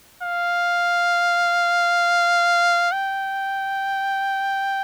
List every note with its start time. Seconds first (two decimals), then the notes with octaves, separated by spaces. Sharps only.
0.22 F5
2.92 G5